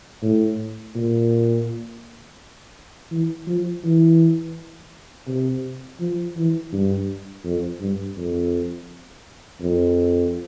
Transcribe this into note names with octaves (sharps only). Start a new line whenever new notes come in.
A2
A#2
E3
F3
E3
C3
F3
E3
G2
F2
G2
F2
F2